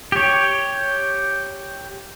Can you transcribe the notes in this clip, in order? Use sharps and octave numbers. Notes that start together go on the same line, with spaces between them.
G4 C#5